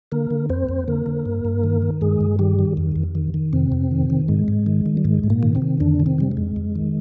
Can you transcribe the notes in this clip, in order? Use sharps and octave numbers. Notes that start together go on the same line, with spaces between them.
D3 A#3 A#4
D3
F2 C4 C5
F2
D3 A#3 A#4
D3
G2
G2
D#3
D#3
G2 G#3 G#4
G2
D#3 G3 G4
D#3
F2
F2
D#3
D#3
F2 C3 C4
F2
D#3
D#3
G#2 G#3
G#2
D#3
D#3
G3
G#2 G#3
G#2
A#2 A#3
D#3
C3 C4
D#3
F2 D3 D4
D#3
C3 C4
C3 G3
G#3
F2
F2
D#3